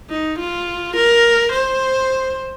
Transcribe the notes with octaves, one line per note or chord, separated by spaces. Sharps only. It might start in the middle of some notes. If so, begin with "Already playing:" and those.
D#4
F4
A#4
C5